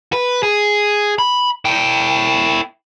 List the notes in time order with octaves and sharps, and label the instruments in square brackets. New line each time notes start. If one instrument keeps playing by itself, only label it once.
[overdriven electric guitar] B4
G#4
B5
E4 G5